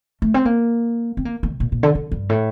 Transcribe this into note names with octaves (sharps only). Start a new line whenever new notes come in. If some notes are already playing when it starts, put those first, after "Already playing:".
A3
C4
A#3
C4
A#3
A#3
C3
A#2
A#2
D3
D3
G2
A2